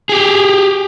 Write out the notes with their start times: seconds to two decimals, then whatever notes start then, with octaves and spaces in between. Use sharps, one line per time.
0.09 G4 G#4